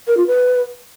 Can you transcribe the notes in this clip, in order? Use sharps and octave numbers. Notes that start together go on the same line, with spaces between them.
A#4
F4
B4